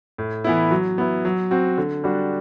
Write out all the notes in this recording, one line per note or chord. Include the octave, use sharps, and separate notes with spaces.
A2
E3 B3 E4
F#3
B3 E4
F#3
C4 F#4
D3
G3 D4 F#4